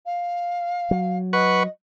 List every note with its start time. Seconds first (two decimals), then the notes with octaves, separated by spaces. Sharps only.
0.06 F5
0.91 F#3
1.33 B4 D#5 F#5 C#6